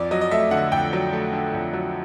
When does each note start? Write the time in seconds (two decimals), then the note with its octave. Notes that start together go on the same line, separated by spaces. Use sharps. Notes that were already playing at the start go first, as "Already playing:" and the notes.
Already playing: F2 D5
0.11 F#3 D#5
0.21 D#5
0.31 A3 E5
0.51 D3 F#5
0.72 F2 G5
0.93 F#3
1.13 A3
1.33 D3
1.54 F2
1.73 F#3